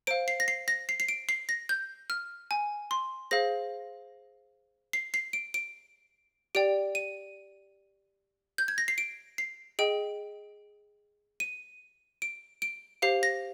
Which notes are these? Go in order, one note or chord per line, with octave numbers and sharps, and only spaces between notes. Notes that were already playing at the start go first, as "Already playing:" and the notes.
C5 F5 D7
C7
A#6
C7
A#6
C7
C7
D7
C7
A#6
G6
F6
G#5
C6
G#4 C5 F5 A#6
C7
C7
D7
D7
G4 D5 G5 D7
D#7
G6
G#6
A#6
C7
D7
C7
G#4 D#5 G5 D7
D#7
D7
D7
G4 C5 F5 C7
A#6